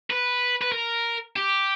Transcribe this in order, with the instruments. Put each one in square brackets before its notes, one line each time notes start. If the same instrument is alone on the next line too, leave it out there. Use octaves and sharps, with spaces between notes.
[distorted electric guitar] B4
B4
A#4
G4